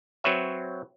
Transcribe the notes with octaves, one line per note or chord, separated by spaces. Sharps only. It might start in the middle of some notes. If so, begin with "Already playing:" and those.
F#3 C4 B4 C#5 E5